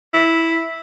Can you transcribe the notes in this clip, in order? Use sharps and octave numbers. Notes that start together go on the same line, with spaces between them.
E4